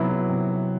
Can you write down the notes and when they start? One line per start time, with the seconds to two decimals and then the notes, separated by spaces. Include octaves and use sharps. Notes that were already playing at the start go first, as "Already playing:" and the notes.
Already playing: C3 F#3 B3 E4
0.29 C3